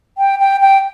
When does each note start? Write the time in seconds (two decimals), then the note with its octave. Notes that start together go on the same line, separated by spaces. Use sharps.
0.17 G5
0.39 G5
0.60 G5